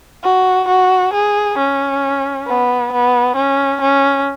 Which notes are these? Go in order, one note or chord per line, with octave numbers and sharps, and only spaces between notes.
F#4
F#4
G#4
C#4
B3
B3
C#4
C#4